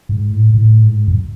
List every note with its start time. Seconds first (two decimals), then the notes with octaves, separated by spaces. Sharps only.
0.09 G#2
0.32 A2
0.54 A2
0.85 G#2
1.08 F#2